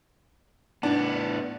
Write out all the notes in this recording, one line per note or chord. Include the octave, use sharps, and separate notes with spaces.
A2 B3 D4